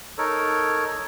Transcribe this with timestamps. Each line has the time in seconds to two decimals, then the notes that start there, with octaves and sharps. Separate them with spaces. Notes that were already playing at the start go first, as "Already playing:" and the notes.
0.18 D#4 A4 A#4 C#5